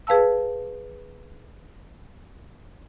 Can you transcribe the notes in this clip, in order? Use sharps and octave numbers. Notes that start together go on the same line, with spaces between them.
G#4 B4 F5 A5 E6